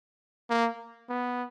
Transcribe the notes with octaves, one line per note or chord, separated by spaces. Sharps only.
A#3
B3